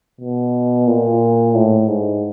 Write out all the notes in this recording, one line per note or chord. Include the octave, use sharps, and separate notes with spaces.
B2
A#2
A2
G#2